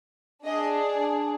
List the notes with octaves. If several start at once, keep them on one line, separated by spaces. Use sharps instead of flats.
D4 G#4 D#5